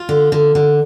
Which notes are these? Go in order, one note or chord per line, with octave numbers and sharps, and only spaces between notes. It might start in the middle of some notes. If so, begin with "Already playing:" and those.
Already playing: F4
D3
D3
D3